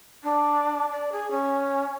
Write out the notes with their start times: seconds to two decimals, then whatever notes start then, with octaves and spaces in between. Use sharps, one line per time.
0.24 D4
0.91 D5
1.12 G#4
1.31 C#4